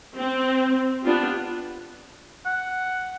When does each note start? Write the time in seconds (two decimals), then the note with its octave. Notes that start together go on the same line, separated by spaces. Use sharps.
0.18 C4
1.03 B3 D4 F4 G4
2.46 F#5